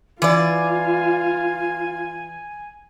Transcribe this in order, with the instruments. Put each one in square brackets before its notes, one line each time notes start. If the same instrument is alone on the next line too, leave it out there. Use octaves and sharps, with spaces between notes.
[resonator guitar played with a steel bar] E3 D5 [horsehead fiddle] F4 [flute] G#5